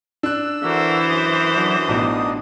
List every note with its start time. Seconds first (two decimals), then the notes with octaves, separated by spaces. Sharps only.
0.23 D4 E6 F#6
0.64 D3 E3 F#4 A#4 C5
1.09 F#2 D#6
1.56 F#3 D4
1.88 A1 B2 D4 D#4